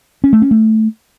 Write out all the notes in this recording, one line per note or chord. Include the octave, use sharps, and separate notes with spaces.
C#4
A3
C#4
A3